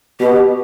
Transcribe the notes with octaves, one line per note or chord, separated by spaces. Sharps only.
B2 G4